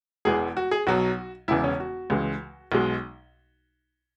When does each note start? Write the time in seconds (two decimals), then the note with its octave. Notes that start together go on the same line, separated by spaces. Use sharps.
0.25 E1 E2 E3 G#3 G#4
0.57 F#4
0.71 G#4
0.87 B1 B2 F#3 F#4
1.48 E1 E2 C#3 E3 E4
1.64 C#4
1.80 F#4
2.10 C#2 C#3 E3 G#3
2.72 B1 B2 G#3